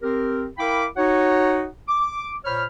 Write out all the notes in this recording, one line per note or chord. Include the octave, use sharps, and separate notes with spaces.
C4 G4 A#4
E4 A#4 F5 G5 B5 D6
D#4 F#4 C#5 F#5
D6
A#2 C5 C#5 B5 F6